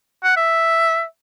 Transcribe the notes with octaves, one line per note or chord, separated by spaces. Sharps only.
F#5
E5